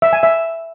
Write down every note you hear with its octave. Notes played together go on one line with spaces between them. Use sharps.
E5
G#5
E5